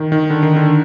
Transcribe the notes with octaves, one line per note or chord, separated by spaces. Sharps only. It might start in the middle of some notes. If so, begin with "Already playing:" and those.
Already playing: D#3
D#3
D3
D#3
D3